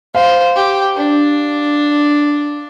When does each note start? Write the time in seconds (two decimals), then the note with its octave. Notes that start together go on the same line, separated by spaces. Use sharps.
0.14 C5 F5
0.55 G4
0.96 D4